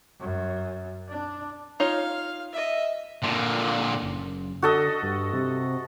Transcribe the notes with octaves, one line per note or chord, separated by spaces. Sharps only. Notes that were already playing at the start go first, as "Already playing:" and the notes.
F#2
D4
D#4 F4 C#5 F5
D#5 E5
A#2 D3
F#1
D3 F#4 A4 D#5
G2
C3